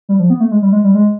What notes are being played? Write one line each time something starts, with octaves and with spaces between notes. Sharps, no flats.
G3
F3
B3
A3
G#3
G3
G#3
G3
G#3